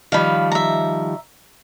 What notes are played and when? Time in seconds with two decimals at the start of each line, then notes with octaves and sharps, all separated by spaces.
0.12 D#3 F3 G3 F5 B5
0.52 E5 A#5